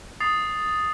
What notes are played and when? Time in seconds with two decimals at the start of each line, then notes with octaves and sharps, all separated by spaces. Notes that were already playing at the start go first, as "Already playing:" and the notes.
0.21 D#6 A6 C7 F7